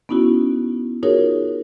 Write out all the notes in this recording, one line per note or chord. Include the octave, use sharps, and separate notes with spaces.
B3 C#4 D#4 E4 F#4
D#4 F4 F#4 G#4 A#4 C#5